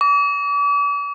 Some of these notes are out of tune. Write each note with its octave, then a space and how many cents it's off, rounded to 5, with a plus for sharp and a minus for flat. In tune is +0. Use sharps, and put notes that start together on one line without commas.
D6 -40